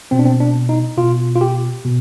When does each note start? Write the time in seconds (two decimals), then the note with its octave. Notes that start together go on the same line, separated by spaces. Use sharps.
0.11 B2 C4
0.19 D4
0.25 C4
0.40 D4
0.69 D#4
0.98 B2 F4
1.36 F4
1.41 G4
1.85 B2